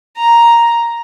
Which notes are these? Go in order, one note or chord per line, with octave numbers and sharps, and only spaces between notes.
A#5